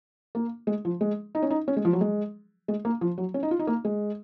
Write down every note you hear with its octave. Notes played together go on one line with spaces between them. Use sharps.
A#3
G#3
F3
G#3
D#4
C#4
D#4
C#4
G#3
F3
F#3
G#3
G#3
A#3
F3
F#3
C#4
D#4
F4
D#4
A#3
G#3